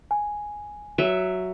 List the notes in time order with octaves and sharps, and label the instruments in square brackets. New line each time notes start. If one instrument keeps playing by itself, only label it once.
[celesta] G#5
[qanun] F#3 E5